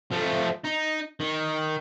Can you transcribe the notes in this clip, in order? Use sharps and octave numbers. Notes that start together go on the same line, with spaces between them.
F3 A3
D#4
D#3